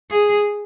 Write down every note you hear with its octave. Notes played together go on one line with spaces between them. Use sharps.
G#4